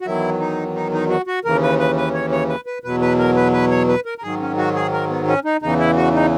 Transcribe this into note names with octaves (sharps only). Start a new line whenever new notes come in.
F#4
E2 D#3 F#3 E4
D#4
D#4
D#4
F#4
F#4
D#2 C#3 E3 A#4
B4
B4
B4
C#5
C#5
B4
B4
E2 B2 F#3 B4
B4
A#4
B4
B4
C#5
B4
A#4
A#4
G#2 D#3 F#3 G#4
C#4
F#4
G#4
A#4
B3
C#4
D#4
E2 C#3 E3 D#4
E4
F#4
D#4